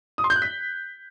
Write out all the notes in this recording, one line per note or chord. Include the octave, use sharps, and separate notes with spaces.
D#6
C6
G6
F#6
B6